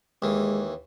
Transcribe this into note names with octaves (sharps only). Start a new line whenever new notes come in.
D#2 E3 G#3